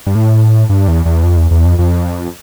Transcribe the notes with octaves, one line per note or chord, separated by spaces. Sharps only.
G2
A2
G2
E2
E2
F2
E2
E2
F2
F2